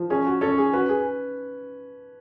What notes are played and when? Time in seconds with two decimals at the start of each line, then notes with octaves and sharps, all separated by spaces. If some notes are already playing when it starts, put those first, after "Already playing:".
Already playing: F3
0.10 C#4 G#4
0.26 F#4
0.41 C#4 A4
0.58 G#4
0.73 F#4 B4
0.89 G#4